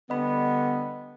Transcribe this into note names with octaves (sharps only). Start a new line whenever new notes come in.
D3 G3 B3 D#5 B5